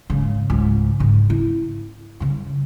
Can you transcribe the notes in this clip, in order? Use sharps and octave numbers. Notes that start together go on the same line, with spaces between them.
G#2 C#3
C#2 G#2
G#2 C#3
E4
G2 C#3